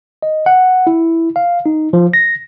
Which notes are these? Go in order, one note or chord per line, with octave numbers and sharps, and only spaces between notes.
D#5
F#5
E4
F5
D#4
F3
A#6